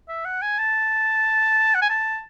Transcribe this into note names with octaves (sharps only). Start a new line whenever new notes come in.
E5
F#5
G#5
A5
F#5
G#5
A5